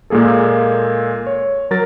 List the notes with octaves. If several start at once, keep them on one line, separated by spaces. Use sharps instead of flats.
A#2 G#3 A#3 G#4 A4
C#5
F#3 A#4 A6